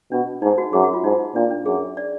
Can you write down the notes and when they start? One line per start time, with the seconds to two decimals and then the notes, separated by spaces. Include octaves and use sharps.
0.12 B2 D4
0.42 G#2 D#4
0.58 F#4
0.73 F#2 G#4
0.84 F#4
0.94 F4
1.04 G#2 D#4
1.35 A#2 D4
1.50 D4
1.66 F#2 G#4
1.97 D5